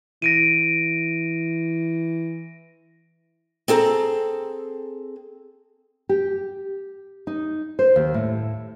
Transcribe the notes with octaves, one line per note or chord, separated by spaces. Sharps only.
E3 A#6 D7 D#7
C4 G#4 A4 A#5
G4
D#4
C5
D#2
A2